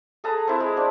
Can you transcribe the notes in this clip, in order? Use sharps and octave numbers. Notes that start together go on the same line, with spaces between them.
G#4 A4 B4 A#5
C4 E4
G#3
C4 D4